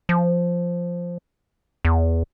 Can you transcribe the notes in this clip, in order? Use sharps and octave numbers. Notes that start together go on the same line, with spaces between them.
F3
E2